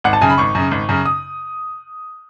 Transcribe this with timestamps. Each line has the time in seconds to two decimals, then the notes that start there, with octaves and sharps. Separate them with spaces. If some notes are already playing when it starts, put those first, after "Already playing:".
0.04 G#1 F#5
0.13 A5
0.22 F#2 C#3 G#5
0.30 B5
0.38 G#1 C#6
0.55 F#2 C#3
0.71 G#1
0.89 F#2 C#3
1.05 D#6